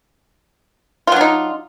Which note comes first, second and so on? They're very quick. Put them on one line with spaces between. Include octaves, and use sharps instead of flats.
F4 F#3 D4 D#4